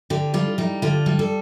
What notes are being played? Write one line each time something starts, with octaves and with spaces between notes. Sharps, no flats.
D3 G4
G3 F4
G3 D#4
D3 F4
G3
A4